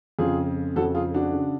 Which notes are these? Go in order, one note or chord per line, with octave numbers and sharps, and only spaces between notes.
F2 C#3 F4 G#4
F2 C#3 F#4 A4
F4 G#4
D4 F#4
C#3